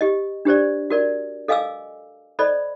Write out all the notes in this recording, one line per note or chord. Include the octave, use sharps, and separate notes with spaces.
G4 D#5
D4 G4 C5 D5
F#4 A#4 D5
A4 D#5 F5 G#5 D6 E6
A4 C5 D5 D#5 B5